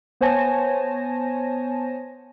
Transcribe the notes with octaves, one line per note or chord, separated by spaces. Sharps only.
B3 C5 C#5 G#5 A5 A#6